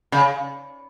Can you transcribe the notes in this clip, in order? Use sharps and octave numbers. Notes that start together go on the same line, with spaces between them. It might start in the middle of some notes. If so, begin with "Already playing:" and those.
C#3